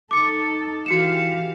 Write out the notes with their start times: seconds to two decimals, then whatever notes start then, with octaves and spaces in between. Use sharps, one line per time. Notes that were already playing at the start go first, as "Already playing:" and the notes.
0.11 D#4 A4 D6 C#7
0.86 E3 F#4 G4 F5 C#7 E7